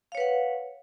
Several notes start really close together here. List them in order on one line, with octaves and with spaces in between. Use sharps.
F5 C#5 B4 F#5